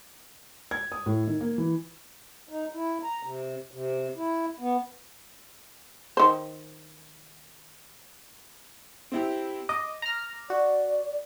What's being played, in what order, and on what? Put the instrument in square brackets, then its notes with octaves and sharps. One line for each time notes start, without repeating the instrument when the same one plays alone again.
[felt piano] G#6
D#6
A2
D#3
A#3
E3
[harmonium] D#4
E4
A#5
C3
C3
E4
B3
[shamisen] D#3 C5
[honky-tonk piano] C4 E4 G4
[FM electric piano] D#5 [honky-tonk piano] D6
[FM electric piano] A#5 F6
[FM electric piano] F#4 [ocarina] D5